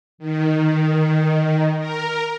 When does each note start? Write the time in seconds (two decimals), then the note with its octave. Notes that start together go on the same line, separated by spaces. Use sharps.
0.18 D#3
1.78 A#4